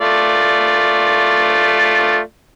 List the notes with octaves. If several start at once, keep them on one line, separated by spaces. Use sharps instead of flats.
A3 F4 D5